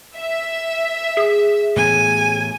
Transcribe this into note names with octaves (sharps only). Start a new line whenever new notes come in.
E5
G#4
A2 E3 B3 G#5